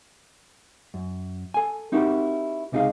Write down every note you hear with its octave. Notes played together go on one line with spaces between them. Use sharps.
F#2
A4 G#5
C4 D#4 E4 F#4 G4 A#4
C#2 C3 D#4 G4 G#4 F5